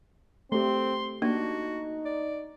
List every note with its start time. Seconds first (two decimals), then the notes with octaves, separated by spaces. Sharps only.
0.52 A3 C4 G4 C6
1.22 A#3 D4 D#4 F#4
2.05 D5